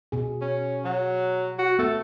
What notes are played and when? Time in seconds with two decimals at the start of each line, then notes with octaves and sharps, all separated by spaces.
0.12 B2 G#4
0.41 C#4
0.85 F#3
1.59 F#4
1.79 A3 B3 A4